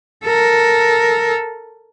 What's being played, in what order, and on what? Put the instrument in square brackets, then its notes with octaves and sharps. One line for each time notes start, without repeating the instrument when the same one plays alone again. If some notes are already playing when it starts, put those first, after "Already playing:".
[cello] A4 A#4